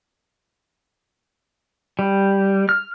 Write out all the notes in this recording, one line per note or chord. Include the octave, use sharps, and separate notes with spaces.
G3
F6